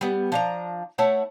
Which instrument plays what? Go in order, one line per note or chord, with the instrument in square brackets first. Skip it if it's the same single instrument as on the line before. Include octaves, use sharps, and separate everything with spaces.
[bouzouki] G3 B3
F3 D4 A#5
A3 E4 C#5 F#5